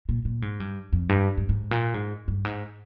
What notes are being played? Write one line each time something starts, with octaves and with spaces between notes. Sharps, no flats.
A#2
A#2
G#2
G2
F2
G2
G2
G#2
A#2
G#2
G2
G#2